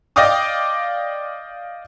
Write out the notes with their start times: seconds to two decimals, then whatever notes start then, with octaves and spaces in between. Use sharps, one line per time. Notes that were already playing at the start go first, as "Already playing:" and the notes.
0.16 D5 D#5 F5 G5 D6 D#6